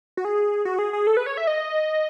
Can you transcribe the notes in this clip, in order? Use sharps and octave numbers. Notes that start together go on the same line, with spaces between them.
F#4
G#4
F#4
G#4
G#4
A4
B4
C#5
E5
D#5